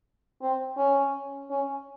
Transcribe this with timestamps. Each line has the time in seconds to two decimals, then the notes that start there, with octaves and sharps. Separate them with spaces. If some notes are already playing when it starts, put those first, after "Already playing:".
0.42 C4
0.77 C#4
1.50 C#4